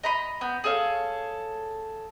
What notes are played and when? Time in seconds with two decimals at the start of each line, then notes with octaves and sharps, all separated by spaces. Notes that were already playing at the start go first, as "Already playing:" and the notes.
0.03 D#5 A#5 B5
0.41 B3 G6
0.64 G#4 A4 C#5 F5